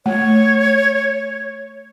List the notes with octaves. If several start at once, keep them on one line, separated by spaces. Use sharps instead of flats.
A3 C#5